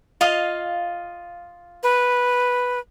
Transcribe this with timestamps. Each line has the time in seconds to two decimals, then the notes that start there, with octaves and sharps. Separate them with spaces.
0.21 F4 D#5 F5
1.83 B4